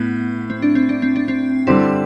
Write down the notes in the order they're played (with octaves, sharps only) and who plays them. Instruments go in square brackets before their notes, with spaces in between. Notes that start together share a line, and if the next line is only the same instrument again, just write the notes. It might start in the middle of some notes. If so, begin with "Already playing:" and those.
Already playing: [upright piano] A2 [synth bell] B3
[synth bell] C4
D4
C4
D4
C4
D4
C4
[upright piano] D3 G3 C4 [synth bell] E4